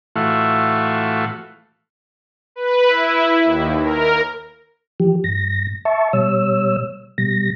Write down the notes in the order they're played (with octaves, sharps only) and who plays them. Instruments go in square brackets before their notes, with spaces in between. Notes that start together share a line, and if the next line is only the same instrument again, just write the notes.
[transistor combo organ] A2 E3 A3 F4 F#4
[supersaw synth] B4
E4
D#2
A#4
[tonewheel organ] E3 F3 G4
G2 A#6
E5 A5 C#6
B2 G3 C#5 E6
B2 G3 A#6